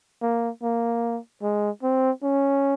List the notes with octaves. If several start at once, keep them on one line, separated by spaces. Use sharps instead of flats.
A#3
A#3
G#3
C4
C#4